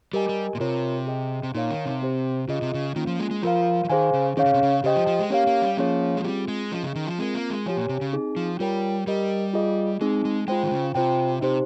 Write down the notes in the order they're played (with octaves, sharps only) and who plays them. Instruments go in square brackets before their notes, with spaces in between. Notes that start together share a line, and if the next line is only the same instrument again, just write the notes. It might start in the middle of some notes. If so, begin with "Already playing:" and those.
[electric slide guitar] G3 [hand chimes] G4 A#4 D#5 G#5
[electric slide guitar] G3
A#2
[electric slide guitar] C3 [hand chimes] F4 A#4 C#5
[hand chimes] G#4 D#5 G5
[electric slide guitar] C3
[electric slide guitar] A#2 [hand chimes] D#4 A#4 C#5 F5
[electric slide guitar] D#3
C3
[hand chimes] C4 G4 C5
[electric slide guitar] C#3 [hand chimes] F4 G#4 D#5
[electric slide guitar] C3
C#3
[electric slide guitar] D#3 [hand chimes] A#3 C#4 F4
[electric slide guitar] F3
G#3
G#3
[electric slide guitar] F3 [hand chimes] F4 A#4 F5
[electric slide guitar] F3
[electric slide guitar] D#3 [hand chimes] G#4 C5 F5 G#5
[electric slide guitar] C#3
[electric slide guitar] D#3 [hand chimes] C#4 G#4 C#5 F5
[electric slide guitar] C#3
C3
C#3
[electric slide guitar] C#3 [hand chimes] G4 C5 D#5 G5
[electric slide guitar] F3
F3
G#3
[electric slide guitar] A#3 [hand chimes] C#4 G4 C#5 F5
[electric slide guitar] A#3
G3
[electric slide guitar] F3 [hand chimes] A#3 C#4 G#4 C#5 F5
[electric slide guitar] G#3
[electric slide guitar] G3 [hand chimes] C4 F4 G#4
[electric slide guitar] G#3
[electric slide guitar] F3 [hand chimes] C#4 G#4 D#5
[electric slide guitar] C#3
D#3
F3
[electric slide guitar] G#3 [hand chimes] C4 F4 A#4
[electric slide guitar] A#3
G#3
[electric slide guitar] F3 [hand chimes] G4 C#5 G#5
[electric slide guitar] A#2
C3
C#3
[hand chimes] C4 D#4 G#4
[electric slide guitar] F3
[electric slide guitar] G3 [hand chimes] F4 A#4 C#5 G5
[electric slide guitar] G3 [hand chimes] G4 A#4 D#5
[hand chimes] F4 G#4 D#5
[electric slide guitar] G#3 [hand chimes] C4 D#4 G#4
[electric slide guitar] G#3
[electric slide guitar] G#3 [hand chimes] F4 C5 G5
[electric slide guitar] D#3
C#3
[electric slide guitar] C3 [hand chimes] F4 C5 G5
[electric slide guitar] C3 [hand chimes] D#4 G4 C5